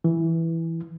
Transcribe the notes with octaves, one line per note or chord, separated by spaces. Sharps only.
E3